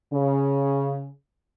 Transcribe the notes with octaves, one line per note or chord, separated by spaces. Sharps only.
C#3